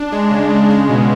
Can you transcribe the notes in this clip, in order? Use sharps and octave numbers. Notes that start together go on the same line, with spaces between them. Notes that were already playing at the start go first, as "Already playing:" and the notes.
Already playing: D4
G#3
C#3
C#3
G#3
B2